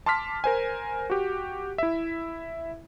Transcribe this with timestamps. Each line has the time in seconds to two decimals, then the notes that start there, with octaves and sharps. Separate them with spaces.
0.06 A5 C6 D6 F6 B6
0.44 A#4 C5 G#5
1.10 F#4 G4
1.78 E4 E5